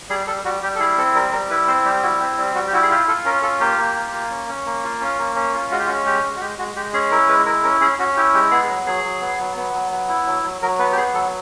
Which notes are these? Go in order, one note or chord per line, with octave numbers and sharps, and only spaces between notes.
G3 G#4
G3 A4
G3 F#4
G3 G4
A4
E4 G#4
C4 A4
G3 A#4
G3 A#4
E4 B4
C4 C5
G3 G4
E4 F#4
C4 G4
G3
G3 F#4
G4
E4 F#4
G#4
F4 G4
F4 A4
C#4 A#4
F4 A4
A#3 G4
A#3
F4
A#3
C#4
C#4
A#3
F4
C#4
A#3
C#4
F4
G#3 F#4
G4
C#4 F#4
G#3 G4
G#3
F#4
G#3 G4
G#3 F#4
G#3 G4
C#4 G#4
E4 A#4
G#3 B4
E4 A#4
C#4 A#4
C#4 G#4
C#4 F#4
E4 G4
G#3 G4
B3 G#4
F#3
F#3 G#4
F#3
B3
F#3
B3
F#3
B3
E4
F#3
F#3
F#3 A#4
B3 B4
G4
B3 G#4
F#3 A4